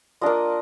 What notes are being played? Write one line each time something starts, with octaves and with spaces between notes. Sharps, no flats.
A#3 D4 F4 D#5